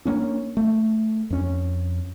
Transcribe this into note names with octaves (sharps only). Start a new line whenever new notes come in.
A#3 C#4 D4
A3
F2 C#4